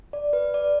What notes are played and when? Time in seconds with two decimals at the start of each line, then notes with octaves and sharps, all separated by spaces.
0.13 D5
0.33 B4
0.54 D5